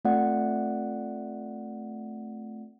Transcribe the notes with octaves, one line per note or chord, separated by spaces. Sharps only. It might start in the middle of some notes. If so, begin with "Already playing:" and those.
A3 C4 F4 D5 F#5